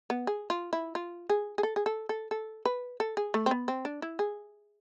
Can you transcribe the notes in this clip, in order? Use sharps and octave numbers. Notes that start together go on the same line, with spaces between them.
B3
G#4
F4
E4
F4
G#4
G#4
A4
G#4
A4
A4
A4
B4
A4
G#4
A3
C4
B3
C4
D4
E4
G#4